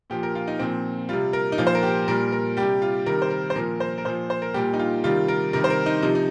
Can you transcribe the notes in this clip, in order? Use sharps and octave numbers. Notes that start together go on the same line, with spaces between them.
A#2 F3 G4
A#4
F4
D#4
A#2 F3 C4
C3 G3 F4
A#4
D#4
A#2 F3 F4
C5
A#4
G4
A#2 G3 A#4
A#4
C3 G3 G4
F4
C3 D#3 G3 A#4
C5
A#4
C5
A#2 F3 A#4
C5
A#4
A#2 F3 C5
C5
A#4
A#2 G3 G4
D#4
F4
C3 D#3 G3 F4
A#4
C3 D#3 G3 A#4
C5
A#4
D#4
C3 F3 D#4
D#4